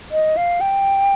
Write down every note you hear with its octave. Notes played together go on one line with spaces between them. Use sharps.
D#5
F5
G5